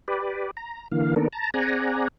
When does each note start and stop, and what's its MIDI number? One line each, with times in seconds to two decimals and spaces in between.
0.08 0.51 67
0.08 0.51 71
0.08 0.51 74
0.57 0.88 82
0.92 1.14 50
0.92 1.14 52
0.92 1.14 58
0.92 1.14 77
1.16 1.28 51
1.16 1.28 58
1.16 1.28 59
1.16 1.28 62
1.16 1.28 69
1.16 1.28 70
1.33 1.50 81
1.33 1.50 82
1.54 2.08 60
1.54 2.08 68
1.54 2.08 74
1.54 2.08 78
1.54 2.08 80
1.54 2.08 82